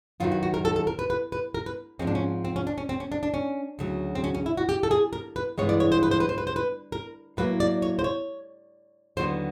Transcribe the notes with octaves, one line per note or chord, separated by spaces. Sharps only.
F#2 D#3 F#3 B3 F4
F#4
F#4
A#4
A4
A4
A#4
B4
B4
B4
A#4
B4
G#2 F3 G#3 C4 C#4
D4
C#4
C4
C#4
D4
C#4
C4
C#4
D4
D4
C#4
D2 C#3 F#3
C4
C#4
C#4
E4
F#4
G4
A4
G#4
A#4
B4
G2 E3 G#3 B3 C#5
D5
C#5
C5
B4
C5
B4
C5
B4
C5
B4
A#4
A2 F#3 A#3 B4
D5
C#5
C5
C#5
D#2 D3 F#3 B3 C5